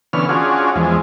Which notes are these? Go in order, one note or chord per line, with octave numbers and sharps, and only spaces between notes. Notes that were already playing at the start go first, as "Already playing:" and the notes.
D3 E3 B3 C#4 F6
C#4 D4 F4 F#4 G#4
E2 F3 G#3